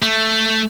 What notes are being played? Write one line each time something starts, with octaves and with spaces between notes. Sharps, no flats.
A3